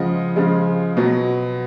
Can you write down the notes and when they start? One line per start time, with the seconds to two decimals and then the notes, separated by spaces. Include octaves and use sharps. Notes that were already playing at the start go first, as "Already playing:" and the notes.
Already playing: C#3 F3 G#3 D#5 F#5
0.36 C#3 F3 G#3
0.97 B2 F#3